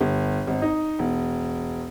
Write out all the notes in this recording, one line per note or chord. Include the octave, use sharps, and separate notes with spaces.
G1
G#1
D#4
E1